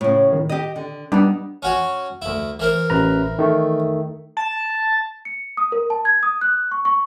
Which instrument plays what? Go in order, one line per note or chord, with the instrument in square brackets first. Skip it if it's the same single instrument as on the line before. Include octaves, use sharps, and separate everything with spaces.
[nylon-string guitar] A2 C#3
[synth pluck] D#3
[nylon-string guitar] G4 D#5
D3
[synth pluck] G3 D4 [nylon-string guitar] B3 D#4
[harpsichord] C#4 F#4 C#5
D2 E4
E3 A#4 C5
[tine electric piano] A1 B4 A#5
D#3 A3
[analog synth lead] A5
[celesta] C#7
D#6
A#4
A5
G#6
D#6
F#6
C#6
C#6